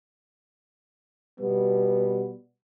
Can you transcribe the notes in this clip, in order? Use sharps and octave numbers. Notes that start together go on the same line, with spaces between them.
B2 G3 B3